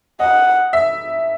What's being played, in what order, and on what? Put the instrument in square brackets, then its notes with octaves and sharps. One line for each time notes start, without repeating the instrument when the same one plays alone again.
[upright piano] D#5 [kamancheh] F#5
[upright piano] E5